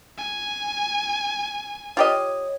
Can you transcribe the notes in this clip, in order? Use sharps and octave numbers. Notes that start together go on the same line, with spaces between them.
G#5
F4 G4 C#5 D#5